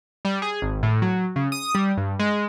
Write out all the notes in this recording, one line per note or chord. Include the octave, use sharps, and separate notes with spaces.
G3
G#4
G#1
A2
F#3
C#3
D#6
G3
G2
G#3